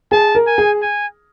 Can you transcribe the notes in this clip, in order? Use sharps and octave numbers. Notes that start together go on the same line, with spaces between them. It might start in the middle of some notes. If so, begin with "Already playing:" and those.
G#4 A5
A#4
G#5
G#4
G#5